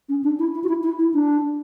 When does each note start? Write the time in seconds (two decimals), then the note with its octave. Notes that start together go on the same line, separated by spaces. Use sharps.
0.09 C#4
0.24 D4
0.39 E4
0.54 E4
0.64 F#4
0.68 E4
0.83 E4
0.99 E4
1.13 D4